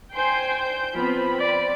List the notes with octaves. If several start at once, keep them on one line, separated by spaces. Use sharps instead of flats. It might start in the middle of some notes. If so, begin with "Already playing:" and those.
C5 G5 G#5 C6 G6
G6
F3 B3 C4 B5
D5